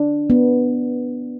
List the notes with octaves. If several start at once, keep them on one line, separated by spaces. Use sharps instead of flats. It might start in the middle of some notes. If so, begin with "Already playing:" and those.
Already playing: D4
B3